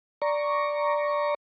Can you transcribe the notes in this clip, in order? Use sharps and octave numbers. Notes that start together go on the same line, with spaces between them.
D5 A#5 C#6